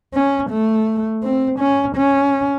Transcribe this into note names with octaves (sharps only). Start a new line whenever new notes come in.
C#4
A3
C4
C#4
C#4